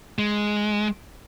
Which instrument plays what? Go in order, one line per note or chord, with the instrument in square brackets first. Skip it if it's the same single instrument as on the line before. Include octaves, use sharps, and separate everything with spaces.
[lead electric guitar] G#3